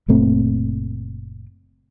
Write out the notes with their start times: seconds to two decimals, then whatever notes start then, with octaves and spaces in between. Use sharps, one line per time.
0.08 F#1 A#2 A3 C4